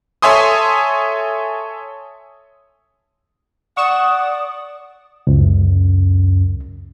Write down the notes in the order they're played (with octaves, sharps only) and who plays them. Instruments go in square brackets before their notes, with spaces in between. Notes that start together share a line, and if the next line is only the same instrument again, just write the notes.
[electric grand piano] A4 C#5 E5 G#5 C6 D#6
[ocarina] D5 [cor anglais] F#5 [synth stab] C#6 E7 [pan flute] D#6
[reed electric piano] C#2 [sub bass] F#2